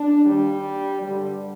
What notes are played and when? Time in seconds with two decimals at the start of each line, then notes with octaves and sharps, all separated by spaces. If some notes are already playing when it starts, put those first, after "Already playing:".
Already playing: D4
0.25 D#2 D#3 G3
1.03 G2 D3 G3